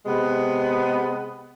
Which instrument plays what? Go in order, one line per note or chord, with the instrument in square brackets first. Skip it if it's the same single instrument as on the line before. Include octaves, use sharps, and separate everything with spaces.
[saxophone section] C3 G#3 B3